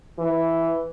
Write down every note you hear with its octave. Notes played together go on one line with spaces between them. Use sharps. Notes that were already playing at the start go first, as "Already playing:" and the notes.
E3